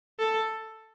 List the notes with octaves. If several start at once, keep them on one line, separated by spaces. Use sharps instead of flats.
A4